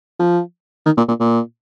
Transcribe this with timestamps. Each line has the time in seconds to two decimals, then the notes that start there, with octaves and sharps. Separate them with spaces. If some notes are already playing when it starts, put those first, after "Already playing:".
0.20 F3
0.86 D#3
0.97 A#2
1.08 A#2
1.20 A#2